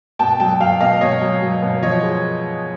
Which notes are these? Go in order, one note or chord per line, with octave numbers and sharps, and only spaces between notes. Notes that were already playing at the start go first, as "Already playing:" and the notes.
B2 G5 A5
F#3 G5 A5
F#3 F5 G5
B2 D#5 F5
B2 C#5 D#5
F#3
F#3
B2
F3 C#5 D#5
G#3